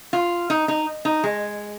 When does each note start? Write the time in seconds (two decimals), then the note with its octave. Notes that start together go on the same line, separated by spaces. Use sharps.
0.13 F4
0.50 D#4
0.68 D#4
1.05 D#4
1.24 G#3